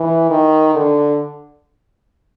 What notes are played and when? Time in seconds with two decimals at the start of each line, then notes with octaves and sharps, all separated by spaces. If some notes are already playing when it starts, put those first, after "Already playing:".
Already playing: E3
0.30 D#3
0.75 D3